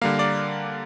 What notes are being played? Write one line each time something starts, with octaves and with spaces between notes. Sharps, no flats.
D3 G3 A#3 F5
D5